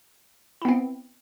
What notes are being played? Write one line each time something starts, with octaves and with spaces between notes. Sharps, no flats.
B3 C4 E4